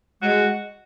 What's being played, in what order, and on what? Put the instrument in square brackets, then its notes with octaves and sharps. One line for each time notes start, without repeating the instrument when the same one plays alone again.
[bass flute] G#3 [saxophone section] F#4